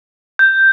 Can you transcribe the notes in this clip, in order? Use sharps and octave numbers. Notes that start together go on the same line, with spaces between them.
G6